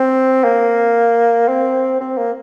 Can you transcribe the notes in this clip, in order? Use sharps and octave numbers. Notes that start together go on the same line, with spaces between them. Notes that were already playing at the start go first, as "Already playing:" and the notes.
Already playing: C4
A#3
C4
C4
A#3